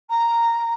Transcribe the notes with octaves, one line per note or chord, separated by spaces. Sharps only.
A#5